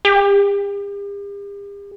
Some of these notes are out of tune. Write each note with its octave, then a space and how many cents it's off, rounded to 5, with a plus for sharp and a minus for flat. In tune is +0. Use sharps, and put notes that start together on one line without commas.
G4 +45